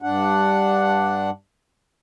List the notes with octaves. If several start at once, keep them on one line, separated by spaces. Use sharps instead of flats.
G2 D4 F#5